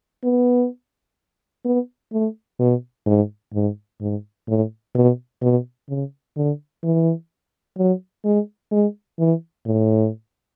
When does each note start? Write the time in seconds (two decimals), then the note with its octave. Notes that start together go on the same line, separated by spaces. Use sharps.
0.24 B3
1.65 B3
2.12 A3
2.59 B2
3.06 G#2
3.53 G#2
4.01 G#2
4.48 A2
4.95 B2
5.42 B2
5.89 C#3
6.36 D3
6.84 E3
7.77 F#3
8.25 G#3
8.71 G#3
9.18 E3
9.66 A2